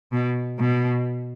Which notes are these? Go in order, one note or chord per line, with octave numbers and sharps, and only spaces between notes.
B2
B2